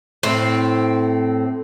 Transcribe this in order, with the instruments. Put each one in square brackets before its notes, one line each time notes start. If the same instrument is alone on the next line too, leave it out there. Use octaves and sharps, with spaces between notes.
[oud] A2 [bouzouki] C4